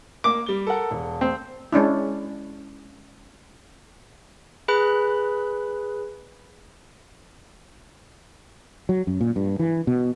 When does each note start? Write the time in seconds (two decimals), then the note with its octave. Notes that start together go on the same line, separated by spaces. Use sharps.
0.24 A#3 D6
0.46 G3 G7
0.67 A4 A#4 F#5
0.91 E1
1.21 C4
1.72 G#3 C#4 D4 E4
4.68 G#4 B4 B5 F#6
8.89 F#3
9.07 F#2
9.21 A#2
9.36 G2
9.59 E3
9.87 B2